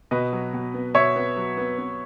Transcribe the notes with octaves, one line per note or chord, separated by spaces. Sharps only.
B2 B4 D#5
F#3
B2
B3
B2 C#5 E5
B3
F#3
B3
B3